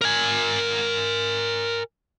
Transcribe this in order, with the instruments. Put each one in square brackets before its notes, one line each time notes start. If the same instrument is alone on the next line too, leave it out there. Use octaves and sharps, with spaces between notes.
[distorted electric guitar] A#4 G#5